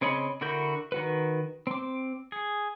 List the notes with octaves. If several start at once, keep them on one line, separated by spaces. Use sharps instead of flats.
C#3 C4 C#5 D#5 B5
D3 E4 F#4 A#4 G6
D#3 F#4 B4
C4 D6
G#4